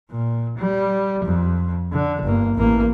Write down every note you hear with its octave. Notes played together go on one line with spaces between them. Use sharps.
A#2
G3
F2
D3
G1 A#3
A1 A#3